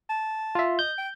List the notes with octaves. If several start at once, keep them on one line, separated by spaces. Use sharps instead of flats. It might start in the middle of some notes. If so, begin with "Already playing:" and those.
A5
F4 E5
D#5 G6
G5